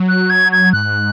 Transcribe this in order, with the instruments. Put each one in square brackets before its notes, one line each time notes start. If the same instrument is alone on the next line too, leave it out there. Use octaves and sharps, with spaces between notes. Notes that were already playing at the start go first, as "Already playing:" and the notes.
Already playing: [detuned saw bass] F#3
[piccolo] F#6
G#6
G#6
[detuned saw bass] G#2 [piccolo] F#6